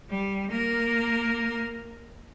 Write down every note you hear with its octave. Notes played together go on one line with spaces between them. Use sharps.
G3
A#3 A#4